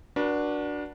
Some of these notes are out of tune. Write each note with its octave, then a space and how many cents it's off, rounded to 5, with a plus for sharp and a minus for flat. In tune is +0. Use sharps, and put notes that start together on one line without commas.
D4 +0 F#4 +0 B4 -45